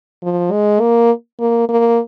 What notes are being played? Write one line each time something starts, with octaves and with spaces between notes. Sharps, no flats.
F3
G#3
A#3
A#3
A#3